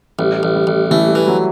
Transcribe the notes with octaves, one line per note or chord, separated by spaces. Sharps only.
A1 G3
A1
G3
A1
E3 A3
G3
E3
F#3